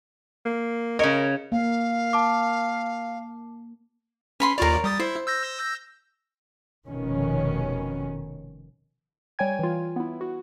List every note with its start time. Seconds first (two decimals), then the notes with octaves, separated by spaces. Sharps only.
0.46 A#3
0.99 C#3 A#4 C#5 D#5
1.52 A#3 F5
2.13 A5 D6
4.40 C#4 B4 B5 C6
4.58 D#2 F4 A#4 C#5 D5
4.84 G3 D#6 A6
5.00 E4 C5
5.27 E6 G6 A#6
6.87 F1 B2 D#3 C#4
9.39 G3 C#5 G5 G#5 G#6
9.59 E3 F4
9.96 B3 E4
10.21 F#4